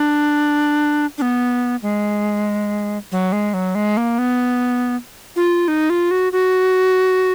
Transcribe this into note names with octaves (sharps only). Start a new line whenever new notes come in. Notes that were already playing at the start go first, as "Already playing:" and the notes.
Already playing: D4
D4
B3
G#3
F#3
G#3
F#3
G#3
A#3
B3
F4
D#4
F4
F#4
F#4